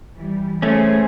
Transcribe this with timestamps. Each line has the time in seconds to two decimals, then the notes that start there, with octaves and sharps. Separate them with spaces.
0.14 E3 G3
0.62 A3 C#4 G#4 C5